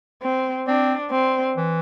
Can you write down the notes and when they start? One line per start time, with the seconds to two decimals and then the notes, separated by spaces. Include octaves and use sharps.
0.22 C4
0.68 C4 D4
1.12 C4
1.56 E3